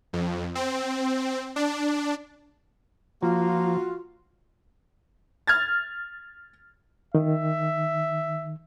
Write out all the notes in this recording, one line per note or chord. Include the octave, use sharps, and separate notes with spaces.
F2
C4
D4
F3 A#3 F4 F#4
F6 G#6 A6
D#3 E5